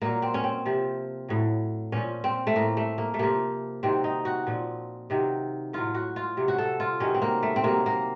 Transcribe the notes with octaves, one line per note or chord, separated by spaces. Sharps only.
A#2 F#3 A#3
C4
C#4
C4
C3 F3
A2 F#3
A#2 F3 C#4
C4
A3
A2 F3 A#3
A3
A#3
A3
C3 F3 A#3
C3 D#3 F#3 C4
D#4
F#4
A#2 F3
C3 D#3 F#3
A2 F#3 F4
F#4
F4
C3 F#3
F#4
A4
F4
C3 D#3 F#3 C#4
C4
A#3
A3
C4
C3 F#3 A#3
A#3